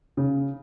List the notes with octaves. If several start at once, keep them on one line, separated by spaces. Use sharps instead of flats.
C#3